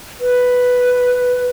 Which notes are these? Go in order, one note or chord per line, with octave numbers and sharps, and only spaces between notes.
B4